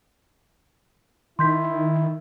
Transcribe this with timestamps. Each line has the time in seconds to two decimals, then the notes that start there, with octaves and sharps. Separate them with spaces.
1.39 D#3 E4 C6 G6 B6